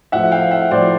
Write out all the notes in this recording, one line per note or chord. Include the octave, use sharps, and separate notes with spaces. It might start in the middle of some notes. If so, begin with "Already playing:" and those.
A2 F3 E5 F#5
F5 G5
E5 F#5
A2 F3 C5 D5